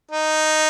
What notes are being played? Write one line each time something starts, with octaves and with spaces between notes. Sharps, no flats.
D#4